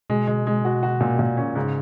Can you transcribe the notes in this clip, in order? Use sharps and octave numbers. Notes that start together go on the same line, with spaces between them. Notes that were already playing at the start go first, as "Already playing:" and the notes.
B2 G#3
G#3
G#3
F#4
F#4
A#2
A#2
C#4
G#2 C#3